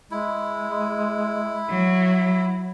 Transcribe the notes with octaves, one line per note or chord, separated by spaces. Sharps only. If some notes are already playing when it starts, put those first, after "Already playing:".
G#3 E4
F#3